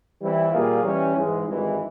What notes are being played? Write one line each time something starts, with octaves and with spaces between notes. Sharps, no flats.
E3 G3 C4 E4
A#2 G3 A#3 F4 G#4
E3 G3 C#4
G#2 E3 G#3
G#1 G2 E3 G#3